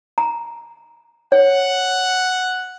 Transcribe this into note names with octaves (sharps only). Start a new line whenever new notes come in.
A#5
C#5 F#5